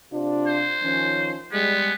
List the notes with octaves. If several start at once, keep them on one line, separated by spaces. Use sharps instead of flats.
C3 D4 F4
C5
D#3 F3 C#4
G3 G#3 B3